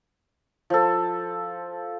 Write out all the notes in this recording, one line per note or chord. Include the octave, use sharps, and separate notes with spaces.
F3 A4